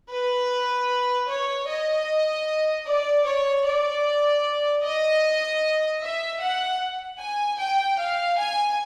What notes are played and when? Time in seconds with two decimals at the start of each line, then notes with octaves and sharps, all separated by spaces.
0.10 B4
1.28 C#5
1.68 D#5
2.86 D5
3.25 C#5
3.64 D5
4.83 D#5
6.01 E5
6.41 F#5
7.19 G#5
7.58 G5
7.98 F5
8.37 G#5